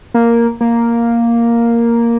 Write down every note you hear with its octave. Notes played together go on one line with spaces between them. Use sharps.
A#3
A#3